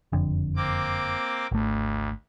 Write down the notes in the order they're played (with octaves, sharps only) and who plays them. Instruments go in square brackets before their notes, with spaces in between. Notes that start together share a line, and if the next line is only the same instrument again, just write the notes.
[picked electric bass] F#1 F2 D3
[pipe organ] A#3 C4 D6
[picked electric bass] G#1 A3 [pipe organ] D2